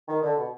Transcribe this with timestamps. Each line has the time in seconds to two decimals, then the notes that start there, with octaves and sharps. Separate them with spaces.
0.08 D#3
0.23 D3
0.38 B2